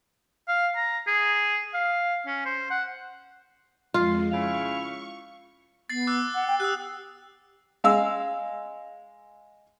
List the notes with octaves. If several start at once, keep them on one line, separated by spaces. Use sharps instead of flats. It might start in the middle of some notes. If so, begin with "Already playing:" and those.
F5
A#5
G#4
F5
C#4
C5
F#5
F2 G#3 F4
C#3 E4 F5 C#6
B3 A6 C7
D6 E6 F#6
F#5
G5
G4 D#6 E6 F#6
G#3 F5 E6